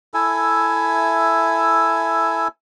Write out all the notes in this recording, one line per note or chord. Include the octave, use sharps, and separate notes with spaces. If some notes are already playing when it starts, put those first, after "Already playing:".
E4 A4 E5 G#5